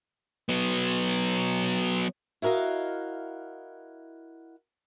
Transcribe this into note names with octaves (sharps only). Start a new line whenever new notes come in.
F#3 B3
E4 F#4 A#4 D#5 F5